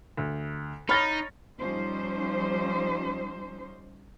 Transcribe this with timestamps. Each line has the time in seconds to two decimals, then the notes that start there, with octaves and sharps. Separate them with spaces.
0.17 D2
0.89 D#4 C#5 B5 F6 A6 A#6
1.58 F3 G3 C#4 D#4 C5